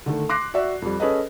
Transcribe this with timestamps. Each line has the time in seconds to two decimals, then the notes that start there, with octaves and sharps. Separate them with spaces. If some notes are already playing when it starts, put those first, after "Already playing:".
0.06 D3 D#3 A3
0.29 C6 D6 F#6 A#6 C7
0.54 F#4 D5 E5
0.82 F2 G3
1.00 C#4 G#4 A4 B4 D#5